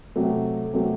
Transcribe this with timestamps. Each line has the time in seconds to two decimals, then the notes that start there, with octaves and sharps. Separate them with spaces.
0.16 C3 F#3 A3
0.73 C3 F#3 A3